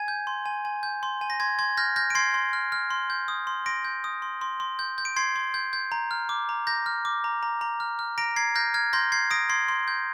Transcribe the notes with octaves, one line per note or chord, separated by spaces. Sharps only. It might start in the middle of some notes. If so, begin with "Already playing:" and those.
Already playing: G#5 G#6
G6
C6
G#5
G#5
G6
C6
G#5
A#6
C6 G#6
C6 G#6
F6 G6 A#6
F6 G6 A#6
D7
C6 G#6 C7
C6
F6
F6
C6
G6
D#6
C6
C6 A#6 D7
G6
D#6
C6
C6
C6
G6
G6
D7
C6 G#6 C7
C6
G6
G6
A#5
F6
D6
A#5
A#5 G6 A#6
F6
D6
A#5
A#5
A#5
F6
F6
A#5 A#6 D7
A#5 G#6 C7
F6 G6 A#6
F6 G#6
C6 G6 A#6
G6 G#6 C7
D#6 A#6 D7
C6 G#6 C7
C6
G6